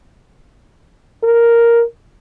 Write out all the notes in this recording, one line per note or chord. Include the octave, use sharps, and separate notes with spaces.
A#4